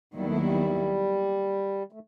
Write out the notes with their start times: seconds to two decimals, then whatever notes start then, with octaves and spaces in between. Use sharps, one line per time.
0.14 D#2 D#3 F#3 G3 B3 E4
0.26 A3
0.37 G3
1.92 A3